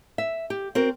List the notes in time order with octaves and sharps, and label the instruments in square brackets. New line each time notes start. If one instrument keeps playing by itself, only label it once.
[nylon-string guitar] E5
G4
C4 F#4 A#4